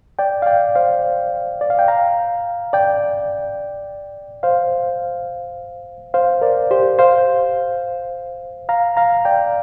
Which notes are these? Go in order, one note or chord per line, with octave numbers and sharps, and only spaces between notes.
D5 G5
F5
D5 G5
C5 F5
D5
F5
G5
F5 A#5
D5 G5
C5 F5
C5 F5
A#4 D5
G4 C5
C5 F5
F5 A#5
F5 A#5
D5 G5